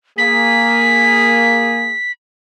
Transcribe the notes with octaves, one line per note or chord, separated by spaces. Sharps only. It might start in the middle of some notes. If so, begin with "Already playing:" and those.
A#3 G#4 B6